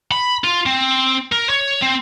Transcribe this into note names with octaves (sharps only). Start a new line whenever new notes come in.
B5
F4
C4
A#4
C#5
C4